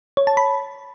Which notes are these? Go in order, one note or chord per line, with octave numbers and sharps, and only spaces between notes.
C#5
A5
B5